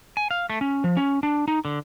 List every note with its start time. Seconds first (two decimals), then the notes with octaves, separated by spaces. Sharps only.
0.17 G#5
0.31 F5
0.50 A3
0.61 C#4
0.84 F3
0.97 C#4
1.23 D4
1.48 D#4
1.65 D3